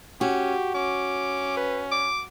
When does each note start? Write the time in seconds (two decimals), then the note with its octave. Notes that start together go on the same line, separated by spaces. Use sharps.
0.21 C#4 F#4 G4
0.75 C#4 D6
1.57 B4
1.92 D6